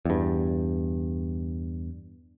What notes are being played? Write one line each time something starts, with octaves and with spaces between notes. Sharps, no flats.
E2 G2